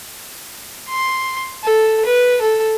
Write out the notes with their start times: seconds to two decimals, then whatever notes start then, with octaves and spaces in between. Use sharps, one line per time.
0.89 C6
1.64 A4
2.05 B4
2.41 A4